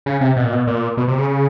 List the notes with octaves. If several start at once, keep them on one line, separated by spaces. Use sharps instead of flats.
C#3
C3
B2
A#2
B2
A#2
B2
C3
C#3